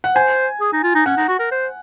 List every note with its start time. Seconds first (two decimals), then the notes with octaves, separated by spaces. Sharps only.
0.04 F#5
0.15 C5 G#5
0.61 G#4
0.72 D#4
0.83 F4
0.95 D#4
1.06 C#4 F#5
1.17 D#4
1.28 F#4
1.39 A#4
1.51 C5